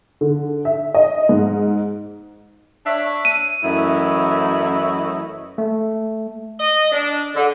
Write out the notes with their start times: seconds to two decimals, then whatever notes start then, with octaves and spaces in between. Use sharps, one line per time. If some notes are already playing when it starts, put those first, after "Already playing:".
0.21 D3
0.65 E5
0.94 D#5
1.29 G#2
2.86 D4 C#5 E5
3.25 D#7
3.63 F#2 E3 A3 E4 D#5 E5
5.58 A3
6.59 D#5
6.91 D4
7.35 D3